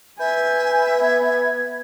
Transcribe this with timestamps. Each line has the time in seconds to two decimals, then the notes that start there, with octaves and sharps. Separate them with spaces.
0.20 B4 E5 G#5 G6
1.04 B3 G#6